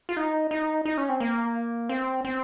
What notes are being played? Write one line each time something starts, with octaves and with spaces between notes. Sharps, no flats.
F4
D#4
D#4
D#4
C#4
C4
A#3
C4
C4